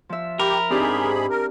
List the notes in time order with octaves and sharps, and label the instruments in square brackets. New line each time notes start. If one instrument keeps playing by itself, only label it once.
[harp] F3 E5
[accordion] G4 [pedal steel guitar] A#4 [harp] A#5 B5
[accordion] G#2 G#4 B5 [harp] C4 D4 G4
[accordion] A#4